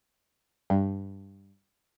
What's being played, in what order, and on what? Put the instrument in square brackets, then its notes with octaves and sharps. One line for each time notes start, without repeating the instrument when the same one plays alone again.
[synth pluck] G2